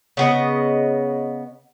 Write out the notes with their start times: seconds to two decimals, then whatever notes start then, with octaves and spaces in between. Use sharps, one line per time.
0.17 C#3 B3 D#5